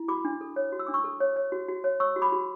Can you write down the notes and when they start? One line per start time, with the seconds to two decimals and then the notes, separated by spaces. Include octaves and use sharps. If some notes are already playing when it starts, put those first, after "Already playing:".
Already playing: E4
0.08 F#4 B5 D6
0.25 D4
0.41 A4
0.56 C#5
0.72 F#4
0.79 E6
0.87 D4 D6
0.94 C#6 E6
1.04 A4
1.20 C#5
1.36 C#5
1.52 F#4
1.68 F#4
1.84 C#5
2.00 C#5 C#6 E6
2.16 F#4
2.22 B5 D6
2.32 F#4